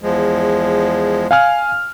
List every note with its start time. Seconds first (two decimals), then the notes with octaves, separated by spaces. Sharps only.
0.02 E2 F3 G#3
1.31 F5 G#5 F6